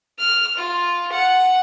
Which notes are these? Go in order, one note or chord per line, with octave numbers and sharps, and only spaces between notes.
F6
F4
F#5